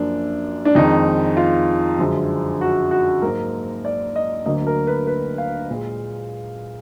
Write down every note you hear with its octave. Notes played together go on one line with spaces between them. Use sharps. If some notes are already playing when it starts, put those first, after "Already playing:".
Already playing: F#2 F3 A#3 D4
D4
F2 D#3 G#3 D#4
F4
F#2 D3 F3 G#3
F#4
F#4
G#2 F#3 A#3 A#4
D5
D#5
D2 D3 F#3 A#3 D#5
A#4
B4
B4
F5
A#2 G#3